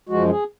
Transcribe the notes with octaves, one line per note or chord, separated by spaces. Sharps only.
F#2 F3 G#3 F#4
G#4